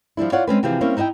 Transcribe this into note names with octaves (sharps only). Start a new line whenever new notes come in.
F3 G3 D4 E4
F4 C#5 D5 F#5
G#3 C4 C#4 B4
C3 E3 F3 G4 G#4
G3 A#3 C4 C#4 E4
D#4 E4 D#5 E5 G5